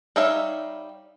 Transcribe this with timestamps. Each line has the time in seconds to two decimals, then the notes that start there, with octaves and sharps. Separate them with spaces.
0.16 G3 D#4 C#5 E5 F5